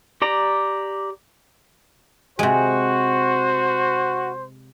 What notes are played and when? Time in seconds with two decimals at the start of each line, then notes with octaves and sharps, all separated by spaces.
0.22 G4 D5 A#5
2.39 C3 G#3 F#4 C5